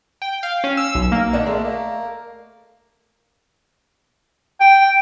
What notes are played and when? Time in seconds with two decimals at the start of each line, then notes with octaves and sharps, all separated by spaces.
0.22 G5
0.43 F5
0.64 C#4
0.77 E6
0.95 B1
1.12 A#3
1.33 D#3 D4 D#4 F#5
1.46 G#3 A3
1.64 A#3
4.61 G5